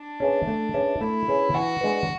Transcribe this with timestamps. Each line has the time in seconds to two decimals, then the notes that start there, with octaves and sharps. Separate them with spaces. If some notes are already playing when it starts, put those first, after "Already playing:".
Already playing: D4
0.20 C#4 G#4 B4 E5
0.47 A3
0.74 C#4 G#4 B4 E5
1.01 A3 E4
1.27 C#4 G#4 B4 E5
1.54 E3 F#4
1.81 G#3 D4 G#4 B4